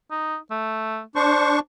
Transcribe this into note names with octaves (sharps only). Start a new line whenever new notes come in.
D#4
A3
D4 C5 C#6